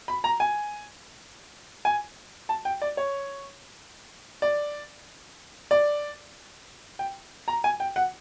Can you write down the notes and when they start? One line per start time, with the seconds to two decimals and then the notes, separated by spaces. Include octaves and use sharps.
0.08 B5
0.24 A#5
0.40 G#5
1.85 G#5
2.49 A5
2.65 G5
2.82 D5
2.97 C#5
4.42 D5
5.71 D5
6.99 G5
7.48 A#5
7.64 G#5
7.80 G5
7.96 F#5